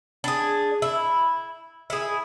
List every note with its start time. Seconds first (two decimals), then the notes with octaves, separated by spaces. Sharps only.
0.24 D4 G#4
0.82 E4
1.90 E4 G#4